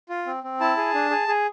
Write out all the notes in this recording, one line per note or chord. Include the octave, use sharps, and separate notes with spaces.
F4
C4
C4
E4 A5
G#4
D4
G#4
G#4